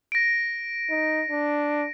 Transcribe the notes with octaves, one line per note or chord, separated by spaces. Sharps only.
A#6 D7
D#4
D4